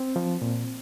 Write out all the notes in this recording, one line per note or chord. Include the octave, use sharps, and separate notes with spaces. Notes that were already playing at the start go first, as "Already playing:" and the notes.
Already playing: C4
F3
A#2